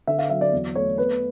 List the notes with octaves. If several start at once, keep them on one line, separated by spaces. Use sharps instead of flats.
D3 E5
F5
F#3 E5
D5
E2
A3 C#5
B3 B4